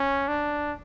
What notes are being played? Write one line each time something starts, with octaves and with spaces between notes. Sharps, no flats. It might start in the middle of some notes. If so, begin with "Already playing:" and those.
Already playing: C#4
D4